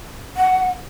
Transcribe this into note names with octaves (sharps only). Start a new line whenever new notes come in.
F#5